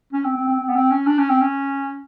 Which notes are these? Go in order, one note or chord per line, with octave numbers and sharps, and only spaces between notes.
C#4
C4
C4
C4
C4
B3
C4
C#4
D4
C#4
C4
C#4